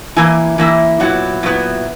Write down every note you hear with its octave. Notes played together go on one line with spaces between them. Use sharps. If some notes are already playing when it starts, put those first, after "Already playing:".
E3 A#3 E4 G#5
E3 A#3 E4
A#2 F#3 B3 E4 F#5
A#2 F#3 B3 E4